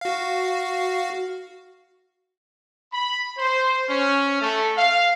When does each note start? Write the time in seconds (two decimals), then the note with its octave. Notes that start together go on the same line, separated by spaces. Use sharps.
0.01 F#4 F5
2.93 B5
3.38 C5
3.88 C#4
4.41 A3
4.77 F5